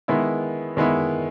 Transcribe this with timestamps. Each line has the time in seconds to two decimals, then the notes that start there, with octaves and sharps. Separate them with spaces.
0.08 D#3 G#3 B3 E4
0.77 D#3 G#3 B3 E4